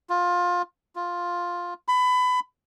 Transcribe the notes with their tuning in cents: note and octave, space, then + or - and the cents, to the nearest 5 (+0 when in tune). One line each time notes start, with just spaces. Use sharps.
F4 +20
F4 +5
B5 +25